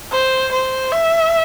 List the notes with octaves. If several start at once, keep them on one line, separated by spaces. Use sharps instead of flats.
C5
C5
E5